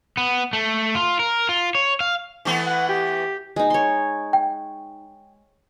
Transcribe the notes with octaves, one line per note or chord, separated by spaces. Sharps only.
B3
A3
F4
A#4
F4
C#5
F5
E3 A3 B3
F#5
G4
G#3 D#4
C#5 C6
G5